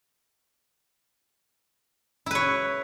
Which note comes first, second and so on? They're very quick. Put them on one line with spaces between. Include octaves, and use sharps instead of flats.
E4 B4 C#5